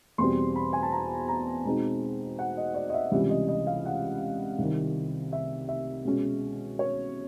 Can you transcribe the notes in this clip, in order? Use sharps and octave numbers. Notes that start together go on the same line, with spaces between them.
E2 B2 G3 C4 C6
B5
G#5
A5
A#5
A#5
B2 G#3 C4 D#4
F#5
D#5
D5
D#5
E5
C#2 C3 E3 G3 E5
D#5
D#5
F5
F#5
C2 C3 D#3
E5
E5
B2 G#3 C#4
C#5